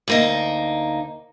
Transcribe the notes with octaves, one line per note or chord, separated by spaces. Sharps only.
D2 A#3 D#4